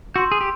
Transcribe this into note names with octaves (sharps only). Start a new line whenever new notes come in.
F#4 C6 E6 G6
G#4
G4